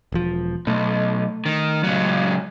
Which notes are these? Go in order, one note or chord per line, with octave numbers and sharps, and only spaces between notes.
E1 F3
B1 A3
D#3
C#2 F#3